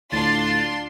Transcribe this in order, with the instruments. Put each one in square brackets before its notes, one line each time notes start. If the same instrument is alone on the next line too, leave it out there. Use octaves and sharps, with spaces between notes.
[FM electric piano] D2 [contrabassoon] A2 [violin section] D4 F4 C6 [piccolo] A6